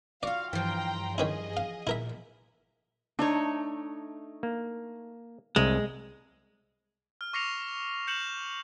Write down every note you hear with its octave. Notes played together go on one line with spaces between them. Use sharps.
F4 F#4 D5 F5
G2 E3 F3 G5 A#5 C6
D#3 C#4 E4 G#4 D#5
F5
A#2 E4 A#4 E5
A3 D4 D#4 C#5
A#3
C2 G#3
F6
C#6 D6 A#6 C7 C#7 F7
G6 C#7 E7 F#7